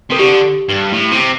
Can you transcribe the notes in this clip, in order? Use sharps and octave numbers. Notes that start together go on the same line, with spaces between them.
C3 A4
D3 G4
G2
A2
C3